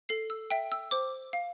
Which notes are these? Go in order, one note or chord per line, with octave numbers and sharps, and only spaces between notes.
A4 C7
E6
E5 G5
E6
C5 D6
F5